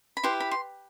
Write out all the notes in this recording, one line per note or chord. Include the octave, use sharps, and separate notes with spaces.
B5
E4 G4 B4 C6
B5
C6